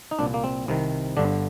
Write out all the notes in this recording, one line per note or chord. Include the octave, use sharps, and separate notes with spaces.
D#4
C2 A#2 D4
A#3
C4
C2 C3 D#3
G1 G2 D3 D4